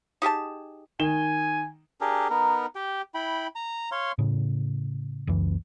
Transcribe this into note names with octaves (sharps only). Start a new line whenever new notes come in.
D#4 G4 G#4 A5
D#3 G#5 E7 G7
D4 G4 G#4 A#4
B3 D#4 A#4
G4 G5
E4 G5 B5
A#5
C#5 F5 C6
A2 C#3
F#1 C#2 F#2 E3